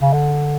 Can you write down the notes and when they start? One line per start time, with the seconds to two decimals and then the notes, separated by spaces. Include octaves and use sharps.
0.01 C#3
0.13 D3